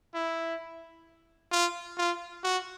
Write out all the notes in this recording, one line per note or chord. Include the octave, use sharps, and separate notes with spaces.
E4
F4
F4
F#4